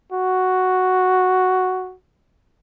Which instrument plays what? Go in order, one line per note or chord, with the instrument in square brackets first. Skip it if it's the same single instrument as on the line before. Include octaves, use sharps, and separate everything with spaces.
[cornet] F#4